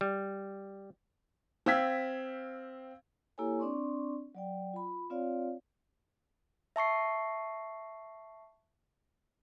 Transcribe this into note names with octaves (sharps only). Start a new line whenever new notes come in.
G3
C4 F5 E6 G#6 B6
A#3 E4 G4 A4 C#5 G#5
C4 D4 D5 C6 C#6
F#3 D5 G5
F4 B5
C4 F4 C#5 D5 F5
E5 A5 C#6 C7